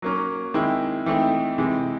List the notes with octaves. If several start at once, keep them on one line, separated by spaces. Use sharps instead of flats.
F#3 A#3 C#4
D#3 G#3 C4 E4
E3 A3 C4 D#4
C3 E3 G#3